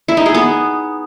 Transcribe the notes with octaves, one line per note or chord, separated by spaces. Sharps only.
E4
D#4
G#4
B3